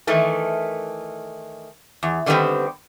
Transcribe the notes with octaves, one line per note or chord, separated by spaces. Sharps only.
D#3 E3 A3
E2
D3 D#3 G3 G#3 B3 C4